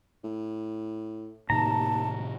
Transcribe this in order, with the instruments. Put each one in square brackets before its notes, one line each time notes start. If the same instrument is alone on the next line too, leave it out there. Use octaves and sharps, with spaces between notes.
[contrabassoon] A2
[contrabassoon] D#2 [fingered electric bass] A2 C3 D#3 [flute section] A5 [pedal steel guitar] A#5